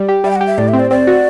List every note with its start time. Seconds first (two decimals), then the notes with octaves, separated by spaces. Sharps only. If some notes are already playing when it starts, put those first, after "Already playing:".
Already playing: G3
0.09 G4
0.24 G3 E5
0.31 G5
0.36 F#5
0.41 G4
0.47 E5
0.58 A2 D5
0.68 E5
0.73 C4
0.80 D5
0.91 C4 D5
1.07 F#4